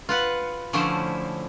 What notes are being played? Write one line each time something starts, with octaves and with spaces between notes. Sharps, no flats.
F4 B4 F#5
D3 F3 A3 C#4 E4 C5